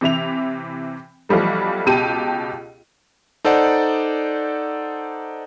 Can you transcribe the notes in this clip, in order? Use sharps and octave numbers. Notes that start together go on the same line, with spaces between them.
C3 E3 E5 F7
B1 E3 F3 G3 A3
C#2 B2 G4 A5 D#7
D#4 A4 C5 D5 F#5